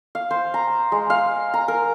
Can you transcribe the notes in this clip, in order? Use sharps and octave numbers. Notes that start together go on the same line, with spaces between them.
F5
C5
A#5
G#3
F5
A#5
A#4